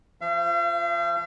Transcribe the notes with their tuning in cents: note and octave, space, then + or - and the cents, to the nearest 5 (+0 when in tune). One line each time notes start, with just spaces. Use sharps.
F3 -15 F5 -45